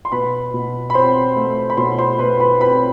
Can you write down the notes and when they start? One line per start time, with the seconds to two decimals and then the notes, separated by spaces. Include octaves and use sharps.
0.05 C6
0.12 B2 B4 B5
0.54 B2
0.90 B5
0.94 C4 C5 C6
1.36 A3
1.70 B5
1.77 B2 C5 C6
1.99 C5 C6
2.19 B2 B4 B5
2.39 B4 B5
2.60 C4 B4 B5